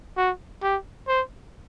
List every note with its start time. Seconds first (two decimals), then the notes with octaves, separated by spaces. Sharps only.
0.17 F#4
0.63 G4
1.08 C5